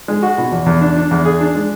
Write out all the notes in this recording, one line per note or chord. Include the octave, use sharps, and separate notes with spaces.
G#3
F#4
B2
E2
E2
D4
D4
E2
G#4
D4
G#3